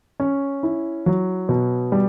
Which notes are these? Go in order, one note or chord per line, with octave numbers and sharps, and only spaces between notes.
C#4
E4
F#3
B2
G3